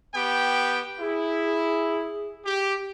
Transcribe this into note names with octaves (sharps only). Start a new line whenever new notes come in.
B3 G4 G5
E4 G#4
G4